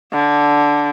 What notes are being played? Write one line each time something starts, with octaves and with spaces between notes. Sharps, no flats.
D3